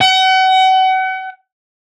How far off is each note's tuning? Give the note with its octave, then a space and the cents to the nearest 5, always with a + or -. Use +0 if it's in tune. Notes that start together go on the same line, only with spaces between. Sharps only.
F#5 +35